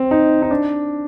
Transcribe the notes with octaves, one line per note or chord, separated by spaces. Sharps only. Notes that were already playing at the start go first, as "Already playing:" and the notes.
Already playing: C4
D#4
D#4
D4